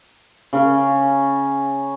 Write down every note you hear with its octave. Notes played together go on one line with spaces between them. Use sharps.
C#3 C#4 C#5